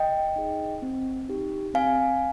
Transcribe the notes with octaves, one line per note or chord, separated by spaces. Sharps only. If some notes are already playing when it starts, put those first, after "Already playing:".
Already playing: D#5 G5
D#4 G#4
C4
D#4 G4
C4 F5 G#5